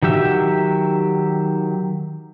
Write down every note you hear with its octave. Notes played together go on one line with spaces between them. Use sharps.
D#3 F#3 G4 E5